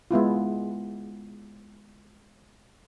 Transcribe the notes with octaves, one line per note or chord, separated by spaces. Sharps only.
G#3 B3 E4 F4